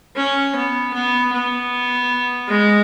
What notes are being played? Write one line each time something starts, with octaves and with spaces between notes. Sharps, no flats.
C#4
B3
B3
B3
G#3